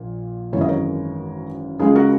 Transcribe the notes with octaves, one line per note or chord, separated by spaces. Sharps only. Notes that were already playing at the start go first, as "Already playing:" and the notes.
Already playing: A#1 A#2
G#1 F#2 E3 G#3 C#5
D#5
A#4 C#5
C#2 C#3 G#3 G#4
F#4 A#4